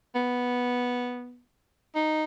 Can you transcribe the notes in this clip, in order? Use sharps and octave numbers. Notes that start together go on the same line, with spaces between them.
B3
D#4